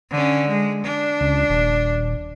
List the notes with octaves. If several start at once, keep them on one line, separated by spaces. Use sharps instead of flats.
D3 C#4
G#3
D4
C#2
D#1